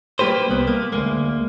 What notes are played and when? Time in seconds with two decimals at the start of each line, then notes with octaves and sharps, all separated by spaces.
0.19 G3 A#3 C4 G4 B4 C5
0.50 C2 B3
0.67 A#3
0.93 D2 A#2 G#3 A#3